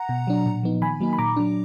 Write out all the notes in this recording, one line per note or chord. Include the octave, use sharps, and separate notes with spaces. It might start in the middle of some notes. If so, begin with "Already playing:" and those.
Already playing: F#5 A#5
B2
F#3 D4
A#2
F3 B3 D#4
D#3 G#5 B5
F#3 A#3 D#4
B5
A#2 A#5 D6
F#3 D4